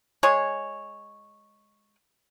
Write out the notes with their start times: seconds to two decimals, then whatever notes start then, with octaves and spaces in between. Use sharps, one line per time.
0.23 G#3 G#4 C#5